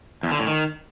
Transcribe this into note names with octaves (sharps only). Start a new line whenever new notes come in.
E2
D3
A2
D#3